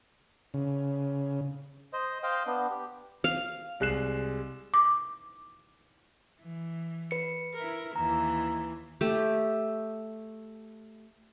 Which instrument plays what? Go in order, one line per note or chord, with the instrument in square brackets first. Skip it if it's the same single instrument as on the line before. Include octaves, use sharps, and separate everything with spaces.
[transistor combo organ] C#3
[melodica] C5 D#5
C5 D#5 F5 G5
B3 D4
G4
[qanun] F5
[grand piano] C2 G#3 F#6 C7 E7
[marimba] D6
[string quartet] E3
[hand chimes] B4 C#7
[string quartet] E4 A#4
[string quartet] D#2 E3 [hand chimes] A#5
[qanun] A3 G4